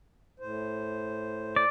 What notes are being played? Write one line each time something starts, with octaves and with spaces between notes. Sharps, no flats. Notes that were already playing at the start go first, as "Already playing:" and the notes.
A2 C5
D5